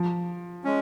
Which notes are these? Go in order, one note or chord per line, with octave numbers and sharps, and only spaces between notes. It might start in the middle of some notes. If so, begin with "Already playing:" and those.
Already playing: F3
G#3 C#4